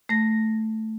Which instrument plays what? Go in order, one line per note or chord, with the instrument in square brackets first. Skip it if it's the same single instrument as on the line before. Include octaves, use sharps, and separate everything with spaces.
[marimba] A3 A#6